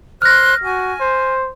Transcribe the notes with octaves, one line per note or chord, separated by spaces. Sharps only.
C5 F6 F#6 A#6
F#4 G#5
C5